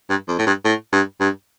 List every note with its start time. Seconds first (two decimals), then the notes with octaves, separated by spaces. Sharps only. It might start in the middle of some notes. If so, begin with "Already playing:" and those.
0.10 G2
0.28 F2
0.39 A2
0.47 G2
0.65 A2
0.93 G2
1.20 G2